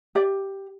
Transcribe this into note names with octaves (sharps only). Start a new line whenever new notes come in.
G4 D5